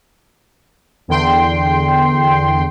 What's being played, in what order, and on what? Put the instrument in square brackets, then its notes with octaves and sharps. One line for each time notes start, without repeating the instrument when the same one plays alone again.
[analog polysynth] E2 D3 G5 C6